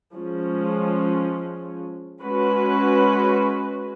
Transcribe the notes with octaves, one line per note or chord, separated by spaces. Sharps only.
F3 G#3 C#4
G#3 C#4 F#4 B4